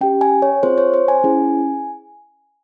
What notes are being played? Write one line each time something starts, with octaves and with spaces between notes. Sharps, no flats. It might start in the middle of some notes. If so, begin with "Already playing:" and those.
C#4 G4 G5
G#5
C#5
C4 F4 G#4 C5
C#5
C5
G#5
C#4 E4 G#4